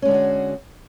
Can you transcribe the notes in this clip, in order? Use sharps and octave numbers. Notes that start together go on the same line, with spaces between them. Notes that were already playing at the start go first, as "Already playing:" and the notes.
D3 G#3 C#4 F#4 G#4